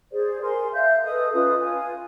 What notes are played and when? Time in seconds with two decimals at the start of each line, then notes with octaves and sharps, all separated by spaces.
0.12 G#4 C5 D5
0.42 A#4 G#5 C6
0.73 E5 F5 G6
1.05 A4 B4 D#5 D#6
1.34 C#4 F4 B4 D#6
1.60 F4 G#5